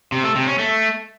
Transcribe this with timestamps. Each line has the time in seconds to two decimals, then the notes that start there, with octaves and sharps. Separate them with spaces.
0.12 C3
0.24 A3
0.35 C3
0.47 C#4
0.59 A3